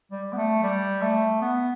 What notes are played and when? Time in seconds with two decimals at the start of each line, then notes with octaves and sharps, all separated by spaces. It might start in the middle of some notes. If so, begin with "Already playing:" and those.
0.12 G3
0.33 B3
0.37 A3
0.63 G3
1.02 A3
1.42 B3